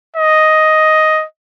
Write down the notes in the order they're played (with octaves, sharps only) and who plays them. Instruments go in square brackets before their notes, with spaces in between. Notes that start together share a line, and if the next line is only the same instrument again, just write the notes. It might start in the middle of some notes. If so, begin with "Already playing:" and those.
[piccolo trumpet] D#5